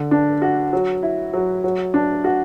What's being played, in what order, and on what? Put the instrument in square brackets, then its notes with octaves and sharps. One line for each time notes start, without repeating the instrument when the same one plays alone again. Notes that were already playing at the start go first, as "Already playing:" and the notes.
Already playing: [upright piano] D3
D4
F#4
F#3
E4
F#3
F#3
D4
F#4